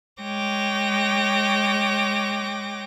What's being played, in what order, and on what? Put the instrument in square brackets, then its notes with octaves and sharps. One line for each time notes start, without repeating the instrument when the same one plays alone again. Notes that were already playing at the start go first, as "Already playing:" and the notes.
[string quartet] G#3 C#5 G5 D6 A#6